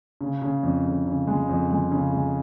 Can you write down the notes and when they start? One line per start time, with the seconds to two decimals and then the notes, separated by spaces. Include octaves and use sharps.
0.21 C#3
0.42 C#3
0.63 F2
0.85 C#3
1.06 C#3
1.27 G#3
1.49 F2
1.71 G#3
1.92 C#3
2.13 G#3